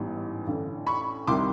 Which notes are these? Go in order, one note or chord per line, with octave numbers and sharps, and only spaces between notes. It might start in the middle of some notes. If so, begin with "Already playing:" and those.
Already playing: A1 G#2 E3 G3 B3
A1 G2 D3
B5 C#6
C2 C3 D#3 G3 C6 D6